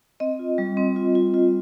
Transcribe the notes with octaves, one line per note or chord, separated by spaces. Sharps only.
C4 D#5
F4
G3
C4
F4
F4
F4